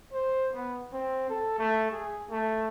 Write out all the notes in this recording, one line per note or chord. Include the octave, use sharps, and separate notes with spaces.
C5
B3
C4
A4
A3
G#4
A3